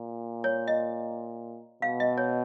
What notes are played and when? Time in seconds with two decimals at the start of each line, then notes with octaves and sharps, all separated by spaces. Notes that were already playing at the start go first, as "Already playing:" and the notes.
Already playing: A#2
0.44 C#5
0.68 D#5
1.82 B2 F5
2.00 D#5
2.18 C#5